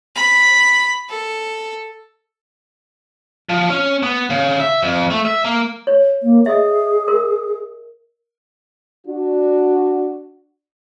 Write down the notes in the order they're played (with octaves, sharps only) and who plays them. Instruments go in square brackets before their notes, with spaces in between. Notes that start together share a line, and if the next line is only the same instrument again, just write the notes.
[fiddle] B5
A4
[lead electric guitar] F3
C#4
B3
C#3
E5
F2
A3
E5
A#3
[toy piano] C#5
[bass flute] A#3
[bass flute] G#4 [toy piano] D#5 E5
[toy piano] A#4
[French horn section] D4 F#4